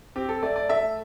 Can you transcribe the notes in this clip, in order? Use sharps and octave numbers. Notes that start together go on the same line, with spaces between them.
C4 G4
A4
A3 D5
D5
A3 E5